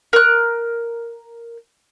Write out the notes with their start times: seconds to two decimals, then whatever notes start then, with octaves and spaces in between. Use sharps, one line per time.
0.13 A#4 F#6